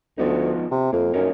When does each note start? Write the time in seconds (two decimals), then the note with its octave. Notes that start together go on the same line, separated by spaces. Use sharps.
0.18 D2 F3 B3 D#4
0.71 C3
0.93 F2 A#3
1.14 F#2 A#3 C#4 D#4